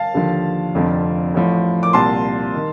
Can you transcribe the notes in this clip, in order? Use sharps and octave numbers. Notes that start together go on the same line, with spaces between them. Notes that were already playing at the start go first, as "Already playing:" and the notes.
Already playing: F5 A5
D#2 D3 F3
F1 F2 D3 F3
A1 A2 F3
D6
C2 A#2 F3 A5 C6
D#3